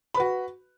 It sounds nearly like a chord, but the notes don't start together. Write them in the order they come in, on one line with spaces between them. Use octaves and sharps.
B5 B4 F#4